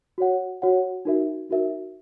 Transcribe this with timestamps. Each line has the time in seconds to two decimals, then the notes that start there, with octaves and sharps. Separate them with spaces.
0.18 F#4 C#5 F#5
0.62 F#4 C#5 F#5
1.05 D#4 F#4 A#4 E5
1.49 D#4 F#4 A#4 E5